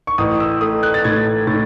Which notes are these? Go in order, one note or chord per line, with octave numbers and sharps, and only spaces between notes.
C#6
A1 D#6
E6
A3 D#6
F#6
A6
A2 G#6
A2 A6